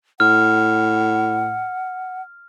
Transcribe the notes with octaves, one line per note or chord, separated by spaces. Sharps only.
A2 F#5 F6